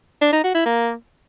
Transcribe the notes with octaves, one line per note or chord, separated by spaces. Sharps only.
D4
D#4
F#4
E4
A#3